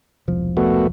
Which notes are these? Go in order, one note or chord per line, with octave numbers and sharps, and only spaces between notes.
E1 C2 F3
A3 B3 F#4